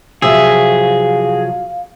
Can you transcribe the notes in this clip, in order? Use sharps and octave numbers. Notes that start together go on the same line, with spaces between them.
C3 F3 F#3 G#4 E5 F5